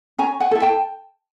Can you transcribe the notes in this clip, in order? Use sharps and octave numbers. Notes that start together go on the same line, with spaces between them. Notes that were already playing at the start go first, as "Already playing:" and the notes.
C#4 G#5 A#5
F#5 G#5
E4 A4
G5 A5